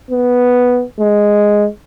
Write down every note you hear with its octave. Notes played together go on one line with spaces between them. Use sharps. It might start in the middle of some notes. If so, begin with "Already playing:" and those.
B3
G#3